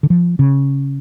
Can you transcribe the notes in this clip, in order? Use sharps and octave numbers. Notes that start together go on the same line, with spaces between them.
D3
F3
C#3